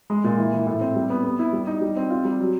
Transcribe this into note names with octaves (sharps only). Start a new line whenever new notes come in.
G#3
A#2
E3
E3
A2
C4
G3
B3
B3
E4
G3
D#4
G3
C4
F4
G3
F#3